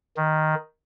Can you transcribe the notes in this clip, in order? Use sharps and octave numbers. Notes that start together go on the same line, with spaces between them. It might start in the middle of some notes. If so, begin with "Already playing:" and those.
D#3